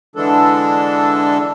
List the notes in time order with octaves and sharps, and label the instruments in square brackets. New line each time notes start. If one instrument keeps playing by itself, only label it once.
[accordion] D3 E3 G#3 D4 A4